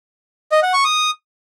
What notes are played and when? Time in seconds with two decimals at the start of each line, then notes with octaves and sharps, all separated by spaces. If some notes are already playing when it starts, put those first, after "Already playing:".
0.52 D#5
0.63 F#5
0.74 C#6
0.84 D#6